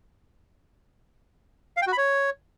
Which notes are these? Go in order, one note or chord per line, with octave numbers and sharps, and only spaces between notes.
F5
G5
F#4
B5
C#5